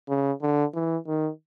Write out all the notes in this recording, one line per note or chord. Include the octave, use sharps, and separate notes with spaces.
C#3
D3
E3
D#3